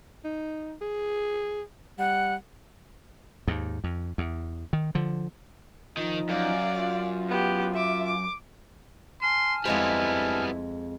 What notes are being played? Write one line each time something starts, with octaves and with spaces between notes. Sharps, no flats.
D#4
G#4
G3 F#5
D#2 G#2
F2
E2
D#3
D3 F3
D#3 F3 D#4
F#2 D5 F5
F4
B3 G4
E5 D6
D6
G#5 A5 C6 F6
F2 G3 G#3 B3 E4 C5